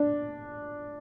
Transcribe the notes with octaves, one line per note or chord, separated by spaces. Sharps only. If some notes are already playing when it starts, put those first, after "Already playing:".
Already playing: D4